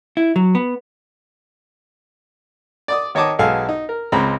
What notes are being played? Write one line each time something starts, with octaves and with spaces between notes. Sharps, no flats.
E4
F#3
B3
D5 D6 D#6
D#3 C#5 D#5 A5 D6 D#6
B1 G#3 A4 F5 G#5 A5
D#4
A#4
C#2 G#3 C4 A#5 B5